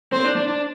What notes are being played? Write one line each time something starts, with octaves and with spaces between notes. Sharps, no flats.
C4 C5
D4
D4
D4